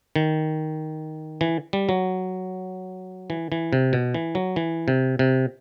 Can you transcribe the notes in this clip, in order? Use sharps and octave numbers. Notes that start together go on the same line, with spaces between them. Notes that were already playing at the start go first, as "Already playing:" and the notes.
D#3
E3
G3
F#3
E3
E3
C3
B2
E3
F#3
E3
C3
C3